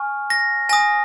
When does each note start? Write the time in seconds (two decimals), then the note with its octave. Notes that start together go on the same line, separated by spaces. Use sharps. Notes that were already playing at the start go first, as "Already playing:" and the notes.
Already playing: G#5 C#6 F6
0.30 A#6
0.69 G#5 D#6 A#6